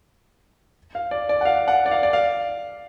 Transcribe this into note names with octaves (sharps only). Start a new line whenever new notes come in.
F5
D5
D5
F#5
F5
F#5
D5
F5
D5
F5